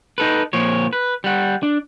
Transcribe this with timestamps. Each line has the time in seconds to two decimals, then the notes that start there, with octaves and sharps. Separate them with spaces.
0.18 D#4 A4 B4
0.53 A#2 F3 C#5
0.93 B4
1.24 G3 F#5
1.63 D4